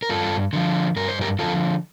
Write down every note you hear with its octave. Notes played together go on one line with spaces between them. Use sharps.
A#4
G2 F4 A4
D3 F3
G2 A#4
C5
G4 A#4
D3 F3 F4 A4